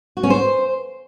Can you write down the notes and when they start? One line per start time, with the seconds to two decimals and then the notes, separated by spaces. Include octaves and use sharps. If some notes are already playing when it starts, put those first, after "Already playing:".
0.17 F#4
0.23 C#4
0.30 C5